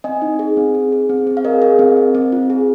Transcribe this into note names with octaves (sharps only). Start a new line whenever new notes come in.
C4 D#5 G#5
D#4
G#4
C4
G#4
G#4
C4
C4
F5
G#4 A#4 D#5
G#4
C4
C4
C4
F4
G#4